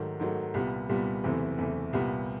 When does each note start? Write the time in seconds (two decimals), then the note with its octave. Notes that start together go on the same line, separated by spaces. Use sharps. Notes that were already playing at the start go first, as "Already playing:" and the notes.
Already playing: G#2 D#3 F#3 A3
0.19 G#2 D#3 F#3 A3
0.54 C2 A#2 G3 B3
0.89 C2 A#2 G3 B3
1.24 F#1 E2 C3 E3 A3
1.58 F#1 E2 C3 E3 A3
1.93 C2 A#2 G3 B3